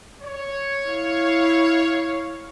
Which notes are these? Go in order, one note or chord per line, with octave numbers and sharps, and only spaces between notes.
C#5
E4 F5